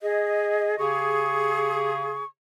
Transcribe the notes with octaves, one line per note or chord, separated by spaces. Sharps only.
G#4 D#5
C#3 G4 G#4 C#6